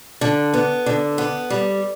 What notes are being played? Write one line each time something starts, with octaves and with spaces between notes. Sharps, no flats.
D3
B3
D3
B3
G3